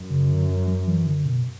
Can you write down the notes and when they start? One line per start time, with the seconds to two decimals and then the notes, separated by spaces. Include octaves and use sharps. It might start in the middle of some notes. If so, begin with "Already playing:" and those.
Already playing: F#2
0.11 C#3
0.29 D3
0.67 F#3
0.87 E3
1.06 D3
1.25 B2